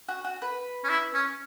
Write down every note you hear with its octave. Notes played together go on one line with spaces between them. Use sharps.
F#4
F#4
B4
C#4
E4
C#4